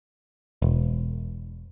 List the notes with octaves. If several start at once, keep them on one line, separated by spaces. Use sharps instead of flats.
E1